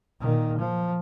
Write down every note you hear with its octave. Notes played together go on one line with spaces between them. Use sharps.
A#2 D#3
F3